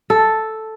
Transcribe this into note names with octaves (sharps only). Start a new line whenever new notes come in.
A4